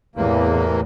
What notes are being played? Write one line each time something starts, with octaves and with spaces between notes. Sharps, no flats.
E2 A2 C3 E3 A#3